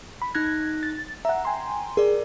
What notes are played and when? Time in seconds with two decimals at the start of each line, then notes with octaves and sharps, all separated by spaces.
0.22 B5
0.35 D#4 F#6 G#6 A#6
0.83 A6
1.25 E5 F#5 A#5
1.45 G5 G#5 C6
1.97 G#4 A#4 D5